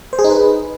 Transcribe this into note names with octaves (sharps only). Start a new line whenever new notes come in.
C5
G#4
D#4
B4